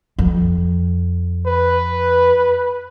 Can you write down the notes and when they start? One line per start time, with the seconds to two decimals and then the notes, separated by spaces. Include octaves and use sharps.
0.19 F2
1.46 B4